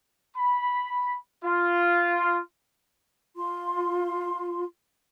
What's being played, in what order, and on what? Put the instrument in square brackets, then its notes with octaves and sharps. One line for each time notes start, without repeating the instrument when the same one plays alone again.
[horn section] B5
F4
[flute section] F4 C6